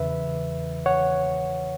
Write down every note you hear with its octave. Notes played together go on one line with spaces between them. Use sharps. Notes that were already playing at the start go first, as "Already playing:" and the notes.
Already playing: E2 C#3 E3 B4 E5
C#5 F#5